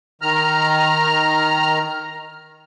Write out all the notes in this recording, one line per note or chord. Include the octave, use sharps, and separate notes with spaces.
D#3 A#5 F6